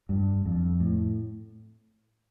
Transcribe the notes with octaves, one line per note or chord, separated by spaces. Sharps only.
G2
F2
A2